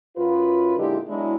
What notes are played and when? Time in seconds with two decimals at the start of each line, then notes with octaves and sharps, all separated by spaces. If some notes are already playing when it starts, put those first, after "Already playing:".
0.17 F#2 F4 B4
0.77 A#2 D3 G#3 D#4 E4 G4
1.08 F#3 G#3 B3 D4 E4